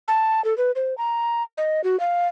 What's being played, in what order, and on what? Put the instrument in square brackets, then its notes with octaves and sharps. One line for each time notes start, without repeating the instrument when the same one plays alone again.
[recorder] A5
A4
B4
C5
A#5
D#5
F#4
F5